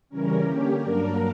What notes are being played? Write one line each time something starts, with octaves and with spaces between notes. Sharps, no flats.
C#3 E3 G3 C#4 A#4
D3 A#3 C#4 G4
G2 F#3 A#3 D4 A#4